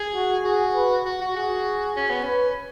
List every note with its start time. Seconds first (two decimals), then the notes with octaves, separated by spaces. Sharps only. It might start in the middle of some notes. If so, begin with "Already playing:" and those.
Already playing: G#4
0.15 F#4
0.45 F#4 G#4
0.75 B4
1.05 F#4
1.21 F#4
1.35 F#4 G#4
1.96 C#4
2.10 B3
2.23 C#4 B4